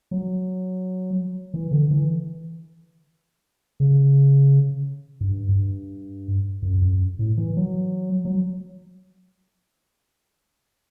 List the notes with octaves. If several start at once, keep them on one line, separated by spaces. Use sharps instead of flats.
F#3
E3
D3
E3
C#3
G2
G2
F#2
F#2
A2
E3
F#3
F#3